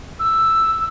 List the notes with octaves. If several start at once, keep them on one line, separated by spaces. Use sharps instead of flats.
E6